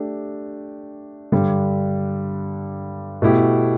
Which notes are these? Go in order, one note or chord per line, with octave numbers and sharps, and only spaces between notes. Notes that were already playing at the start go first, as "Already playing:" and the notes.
Already playing: A3 D4 G4
G2 D3 G3 D4
B2 A3 E4 G4